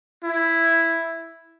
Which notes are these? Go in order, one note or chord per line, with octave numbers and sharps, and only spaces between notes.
E4